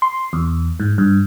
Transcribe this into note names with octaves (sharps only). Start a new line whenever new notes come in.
C6
E2
G#2
G2